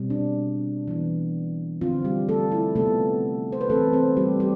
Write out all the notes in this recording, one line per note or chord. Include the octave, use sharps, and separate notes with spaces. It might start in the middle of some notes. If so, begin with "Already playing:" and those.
Already playing: B2 G3 C4
D4
E3 B3
D3 F3 C4 F4
G3 G4
A3 A4
E4
C3 F3 A3 B3 A4
C5
B4
E3 A3 C4 A4
C4 C5
G3 G4
G3 G4